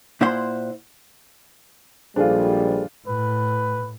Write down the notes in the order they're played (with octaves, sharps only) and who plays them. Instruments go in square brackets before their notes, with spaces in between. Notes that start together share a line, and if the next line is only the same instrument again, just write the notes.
[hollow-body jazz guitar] A#2 E4 C5 F#5 C6
[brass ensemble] A#1 G#2 G3 [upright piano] D4 F4 [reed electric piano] G#4 A4 C5
[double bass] A2 [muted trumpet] B4